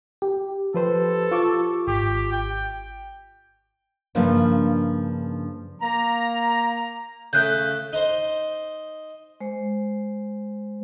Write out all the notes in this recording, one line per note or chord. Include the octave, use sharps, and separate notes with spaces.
G4
F3 A4 B4 C5
F4 C#6 D6
G#1 G4
G5
G2 C#3 F3 A#3 D4 D#4
A#3 A#5
C#3 A3 F#6 G6
D#4 C5
G#3 C5